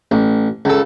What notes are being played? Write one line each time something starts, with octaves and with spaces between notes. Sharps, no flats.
A1
C#2 A4